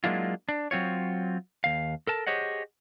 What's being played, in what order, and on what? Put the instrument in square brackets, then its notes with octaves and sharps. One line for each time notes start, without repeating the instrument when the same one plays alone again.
[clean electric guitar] F#3 G#3 A#3 D4 E4 F4
D4
F#3 C4 F4 C#5
D#2 F5
A4 A#4 A5
G4 G#4 C5 C#5 D#5 F#5